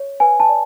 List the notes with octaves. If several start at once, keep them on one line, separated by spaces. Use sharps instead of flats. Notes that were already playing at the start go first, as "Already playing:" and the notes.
Already playing: C#5
B4 G#5
A5
D5